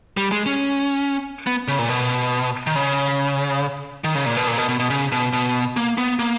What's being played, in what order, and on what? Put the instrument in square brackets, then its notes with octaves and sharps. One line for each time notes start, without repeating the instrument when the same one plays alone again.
[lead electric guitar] G3
G#3
C#4
B3
C#3
A#2
B2
D#3
C#3
D#3
C#3
A#2
B2
A#2
B2
B2
B2
C#3
B2
B2
A#3
B3
A#3